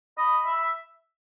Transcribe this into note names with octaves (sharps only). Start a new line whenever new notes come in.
D#5 B5
E5